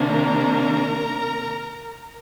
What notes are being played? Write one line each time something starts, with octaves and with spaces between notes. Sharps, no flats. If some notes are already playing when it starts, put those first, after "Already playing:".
Already playing: C3 D#3 A#3 D4
A#4 A#5